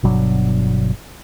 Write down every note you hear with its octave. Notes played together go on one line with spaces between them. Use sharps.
G1 B2 F#3 D4